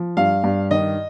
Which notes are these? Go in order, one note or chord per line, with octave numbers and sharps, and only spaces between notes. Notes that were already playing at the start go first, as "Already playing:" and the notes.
Already playing: F3
G2 F5
G2
D#3 D#5